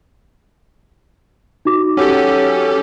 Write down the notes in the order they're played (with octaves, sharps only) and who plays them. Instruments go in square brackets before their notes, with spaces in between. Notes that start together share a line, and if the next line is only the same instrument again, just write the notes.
[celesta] D#4 F#4 D6
[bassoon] F#3 [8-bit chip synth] C#4 G4 A4